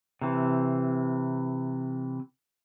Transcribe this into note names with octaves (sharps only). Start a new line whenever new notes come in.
C3 E3